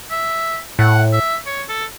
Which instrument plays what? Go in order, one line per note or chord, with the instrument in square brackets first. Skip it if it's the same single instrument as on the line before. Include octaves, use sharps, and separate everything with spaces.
[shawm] E5
[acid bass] A2 [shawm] F#5
[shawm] E5
C#5
A4